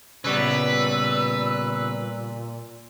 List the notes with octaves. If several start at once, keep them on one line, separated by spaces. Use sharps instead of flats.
A#2 C#3 G3 B3 B4 E6